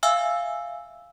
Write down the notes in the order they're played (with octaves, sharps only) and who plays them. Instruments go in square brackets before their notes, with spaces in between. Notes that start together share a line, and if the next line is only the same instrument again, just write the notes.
[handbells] E5 F5 G#5 E6 F6